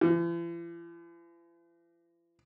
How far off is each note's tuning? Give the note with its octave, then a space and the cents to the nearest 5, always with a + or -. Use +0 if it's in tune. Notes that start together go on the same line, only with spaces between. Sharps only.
E3 +45